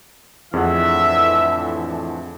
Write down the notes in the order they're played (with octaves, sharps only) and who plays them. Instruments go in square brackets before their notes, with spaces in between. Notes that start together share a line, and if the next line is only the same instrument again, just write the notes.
[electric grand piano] F2 G#4 F#5 [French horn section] A2 D3 E3 [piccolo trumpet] E5